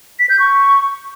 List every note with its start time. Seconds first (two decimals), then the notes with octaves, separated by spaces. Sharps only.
0.19 B6
0.29 G6
0.40 C#6